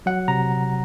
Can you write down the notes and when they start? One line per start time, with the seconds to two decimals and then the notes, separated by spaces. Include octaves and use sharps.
0.06 F#3 F#5
0.28 C3 A#5